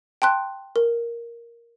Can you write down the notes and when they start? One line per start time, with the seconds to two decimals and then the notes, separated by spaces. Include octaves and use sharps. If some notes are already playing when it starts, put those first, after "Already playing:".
0.22 G5 A5 C6 F#6
0.76 A#4